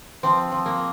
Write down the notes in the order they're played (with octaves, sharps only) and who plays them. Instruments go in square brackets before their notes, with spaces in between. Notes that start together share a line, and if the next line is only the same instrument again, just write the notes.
[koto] F3 C4
F3
A#3